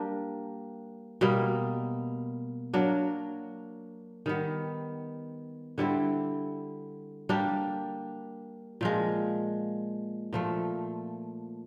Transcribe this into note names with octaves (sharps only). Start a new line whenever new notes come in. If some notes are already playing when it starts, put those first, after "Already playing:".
Already playing: G3 A#3 D4 G4
B2 G3 A#3
F#3 A#3 D4
D#3 G3 B3
D3 G3 C4 E4
G3 A#3 D4 G4
A#2 F3 G#3
A#2 F3 A3